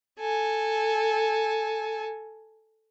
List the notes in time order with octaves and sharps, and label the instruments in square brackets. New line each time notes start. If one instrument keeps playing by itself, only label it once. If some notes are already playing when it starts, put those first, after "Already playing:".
[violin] A4 G#5